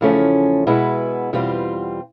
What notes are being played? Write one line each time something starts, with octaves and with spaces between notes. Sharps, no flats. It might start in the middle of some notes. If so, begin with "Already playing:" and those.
E2 C#3 F3 A3 C#4
B2 G#3 B3 E4
E2 B2 G3 C4 F4